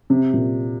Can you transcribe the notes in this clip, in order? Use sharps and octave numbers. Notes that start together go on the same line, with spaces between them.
C3
A#2